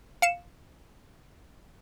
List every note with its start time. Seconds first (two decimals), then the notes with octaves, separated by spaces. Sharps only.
0.22 F5 C#7 E7